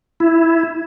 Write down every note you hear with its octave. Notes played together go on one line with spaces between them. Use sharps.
E4